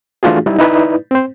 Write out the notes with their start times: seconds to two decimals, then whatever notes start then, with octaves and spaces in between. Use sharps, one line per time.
0.23 E3 A3 D4 F4 F#4 G#4
0.46 G3 D#4 E4
0.59 D#4 E4 B4 D5
1.11 C4 C5